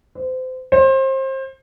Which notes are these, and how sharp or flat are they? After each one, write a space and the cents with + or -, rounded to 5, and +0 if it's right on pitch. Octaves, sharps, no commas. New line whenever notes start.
C5 -30
C5 +30